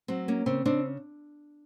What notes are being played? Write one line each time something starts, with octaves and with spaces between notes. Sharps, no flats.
F#3 C4
A#3 C#4
C#3 C4
C#3 C4 D4